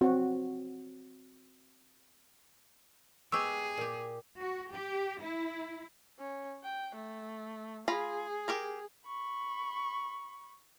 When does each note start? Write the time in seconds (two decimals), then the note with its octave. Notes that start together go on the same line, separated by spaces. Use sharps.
0.01 C4 F#4
3.32 G#3 B3 G4 G#4 C#6 E6
3.77 A#2 G4
4.38 F#4
4.73 G4
5.20 E4
6.19 C#4
6.64 G5
6.96 A3
7.88 F4 G#4 A#5 B5
8.48 G4 A#4 A#5
9.05 B5 C#6